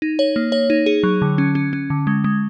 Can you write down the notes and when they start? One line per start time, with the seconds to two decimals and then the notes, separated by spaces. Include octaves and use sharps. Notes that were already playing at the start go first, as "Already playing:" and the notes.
0.02 D#4
0.19 C#5
0.36 A#3
0.52 C#5
0.70 D#4
0.86 G#4
1.03 F#3
1.22 D3
1.38 C#4
1.55 C#4
1.73 C#4
1.90 D3
2.07 G#3
2.24 G#3